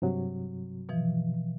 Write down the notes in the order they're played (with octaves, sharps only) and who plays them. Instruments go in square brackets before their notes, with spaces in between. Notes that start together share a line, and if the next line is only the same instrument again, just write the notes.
[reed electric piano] G2 C3 F#3
[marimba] B2 E3 F3